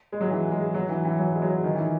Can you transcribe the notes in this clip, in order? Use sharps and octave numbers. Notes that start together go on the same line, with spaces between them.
G#3
F#3
E3
G#3
F#3
E3
E3
F#3
G#3
F#3
D#3
E3